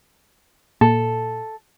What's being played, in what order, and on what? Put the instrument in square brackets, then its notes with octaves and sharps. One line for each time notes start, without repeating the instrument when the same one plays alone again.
[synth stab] A#2 [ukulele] A4